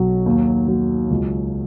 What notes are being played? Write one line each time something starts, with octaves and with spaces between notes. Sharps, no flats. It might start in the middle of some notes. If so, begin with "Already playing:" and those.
Already playing: B1 F#3
D#2
F#3
C#2